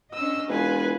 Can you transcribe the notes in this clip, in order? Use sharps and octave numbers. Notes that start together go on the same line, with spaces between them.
C#4 D4 D#5 E6
E1 F4 B4 G#5